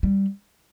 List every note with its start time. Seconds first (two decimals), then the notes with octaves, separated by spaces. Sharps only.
0.03 G3